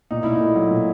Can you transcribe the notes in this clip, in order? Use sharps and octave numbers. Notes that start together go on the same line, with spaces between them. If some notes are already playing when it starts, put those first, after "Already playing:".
A#2 D#4
A#2 E4
D#4
A3
F#3
A#2